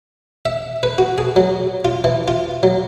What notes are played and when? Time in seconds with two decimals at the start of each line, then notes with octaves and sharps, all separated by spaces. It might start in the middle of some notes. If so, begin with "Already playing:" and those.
0.45 E5
0.83 B4
0.98 F#4
1.18 G#4
1.36 F#3
1.85 F4
2.04 E3
2.28 F4
2.63 F#3